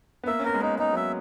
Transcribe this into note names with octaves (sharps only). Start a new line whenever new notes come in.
B3
A#3 E5
C#4
B3 A#4
G#3
A#3 D#4
G#3 D#4
F#3 E5